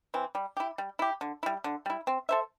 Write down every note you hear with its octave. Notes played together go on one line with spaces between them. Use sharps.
E3 C4
G3
E4 G4
G3
E4 G4
D3
G3 E4
D3
G3 E4
C4
A4 C5 E5